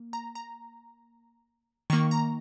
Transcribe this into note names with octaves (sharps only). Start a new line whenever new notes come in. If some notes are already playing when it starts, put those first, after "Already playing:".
Already playing: A#3
A#5
A#5
D#3 A#3 C#6
A#5